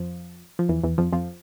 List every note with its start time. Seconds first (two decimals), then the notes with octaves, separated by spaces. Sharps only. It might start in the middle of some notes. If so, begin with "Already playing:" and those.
Already playing: F2 F3
0.59 F3
0.69 E2 E3
0.84 E2 E3
0.98 F2 F3
1.13 F2 F3